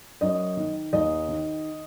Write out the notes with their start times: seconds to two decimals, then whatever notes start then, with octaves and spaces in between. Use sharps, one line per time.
0.21 F#2 D#5
0.57 D#3
0.93 D#2 D#5
1.29 D#3